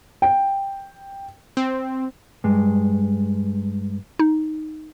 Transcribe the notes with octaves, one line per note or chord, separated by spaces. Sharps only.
G5
C4
G2 G#3
D#4